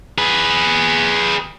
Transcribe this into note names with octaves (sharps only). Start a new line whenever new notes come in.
G#4 B4